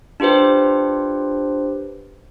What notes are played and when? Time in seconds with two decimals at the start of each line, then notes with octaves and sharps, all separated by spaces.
0.20 D4 F4 G4 B4 C5